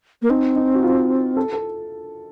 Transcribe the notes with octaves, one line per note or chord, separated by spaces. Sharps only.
A#3
C4 D#4
D#4
F#4
F4
A4
A4